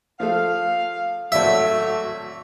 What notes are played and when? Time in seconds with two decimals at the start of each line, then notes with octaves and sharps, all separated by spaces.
0.20 F3 A3 A4 F5
1.32 G#1 A2 F#3 A3 D5 E5